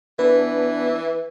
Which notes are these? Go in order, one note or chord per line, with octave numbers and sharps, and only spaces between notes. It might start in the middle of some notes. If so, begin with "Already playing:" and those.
E3 B3 D4 B4